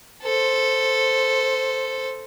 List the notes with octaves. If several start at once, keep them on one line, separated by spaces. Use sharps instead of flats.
A4 C5